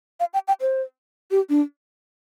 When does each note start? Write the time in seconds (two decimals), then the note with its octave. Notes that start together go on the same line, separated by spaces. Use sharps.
0.20 F5
0.34 G5
0.48 G5
0.61 C5
1.31 G4
1.49 D4